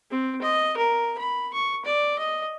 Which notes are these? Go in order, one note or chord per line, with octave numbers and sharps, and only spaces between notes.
C4
D#5
A#4
B5
C#6
D5
D#5